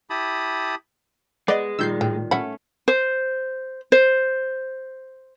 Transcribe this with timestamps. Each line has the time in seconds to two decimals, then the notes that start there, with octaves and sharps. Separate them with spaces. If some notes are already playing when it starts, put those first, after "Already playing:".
0.10 E4 G4 A5 B5 D#6
1.48 G#3 B3 D5 D#5
1.79 A#2 D#3 G3 E6 G6 C7
2.01 A2 G5
2.31 A3 C#4 E5 F#5 B5
2.88 C5
3.92 C5